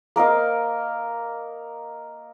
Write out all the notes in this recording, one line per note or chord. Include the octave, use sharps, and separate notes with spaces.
A#3 A#4 D#5 F5